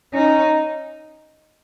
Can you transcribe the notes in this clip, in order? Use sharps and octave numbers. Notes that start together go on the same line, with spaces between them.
C#4 D#4